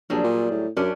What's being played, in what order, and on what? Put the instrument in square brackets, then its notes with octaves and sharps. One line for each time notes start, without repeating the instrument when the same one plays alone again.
[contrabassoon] A#1 [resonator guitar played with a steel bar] F#3 G3 G#4
[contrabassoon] A#2
A2
[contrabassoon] F#2 [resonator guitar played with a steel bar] C#4 D4 G4